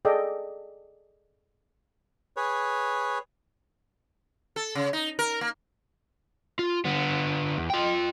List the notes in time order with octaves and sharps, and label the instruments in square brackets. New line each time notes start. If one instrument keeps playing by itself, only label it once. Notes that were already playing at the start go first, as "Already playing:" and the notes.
[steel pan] G#4 A4 D5 D#5 G5 E6
[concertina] G#4 B4 C#5
[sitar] A4
C#3
D#4
A#4
A#3
[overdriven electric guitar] F4
D3 B3
E2
F4 G5